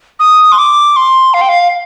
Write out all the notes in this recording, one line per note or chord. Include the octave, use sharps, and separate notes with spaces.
D#6
C6
D6
C6
F5
G5
F5